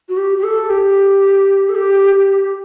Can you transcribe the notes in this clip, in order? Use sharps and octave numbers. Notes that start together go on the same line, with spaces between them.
F#4
G4
G4
A4
G4
A4
G4
G4